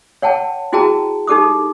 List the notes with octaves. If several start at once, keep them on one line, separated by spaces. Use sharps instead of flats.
C#5 F#5 G5 A5
E4 F#4 G#4 G5 A5 A#5
D#4 G4 A4 D6 D#6